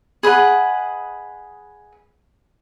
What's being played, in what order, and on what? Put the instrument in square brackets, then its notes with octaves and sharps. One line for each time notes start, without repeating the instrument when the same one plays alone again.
[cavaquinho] G#4 B4 D#5 F#5